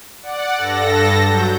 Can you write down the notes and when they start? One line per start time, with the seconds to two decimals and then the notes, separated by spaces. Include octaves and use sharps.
0.22 D5 F#5
0.55 G2 A4 A#6
1.21 F#3 G6